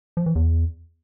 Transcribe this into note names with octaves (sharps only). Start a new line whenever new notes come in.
F3
E3
E2